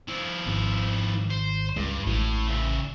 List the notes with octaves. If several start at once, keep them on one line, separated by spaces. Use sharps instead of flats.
F3 E4
G#1
C5
C#2 G2
A1 A2
C#3 E5